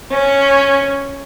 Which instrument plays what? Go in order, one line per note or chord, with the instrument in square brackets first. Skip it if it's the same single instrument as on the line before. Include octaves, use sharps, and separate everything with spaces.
[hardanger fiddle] C#4